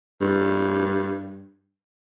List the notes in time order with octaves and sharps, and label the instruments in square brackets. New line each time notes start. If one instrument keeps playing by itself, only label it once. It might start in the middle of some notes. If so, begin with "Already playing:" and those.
[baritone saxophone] G2